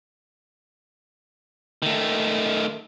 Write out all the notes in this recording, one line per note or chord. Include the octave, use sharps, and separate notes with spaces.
D#3 A3